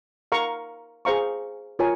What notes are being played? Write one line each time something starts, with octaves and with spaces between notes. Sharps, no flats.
A#4 F5 A#5 C#6
G#4 C5 F5 A#5 C#6
F4 A#4 C#5 G#5